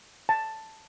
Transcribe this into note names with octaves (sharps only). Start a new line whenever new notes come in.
A5